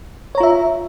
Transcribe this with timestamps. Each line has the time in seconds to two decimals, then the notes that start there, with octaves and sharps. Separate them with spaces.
0.35 C#5
0.38 A#5
0.40 F4
0.43 E5